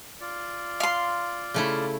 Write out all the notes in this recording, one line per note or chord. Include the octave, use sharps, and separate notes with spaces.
F4 D5
F5 C6
C#3 A3 E4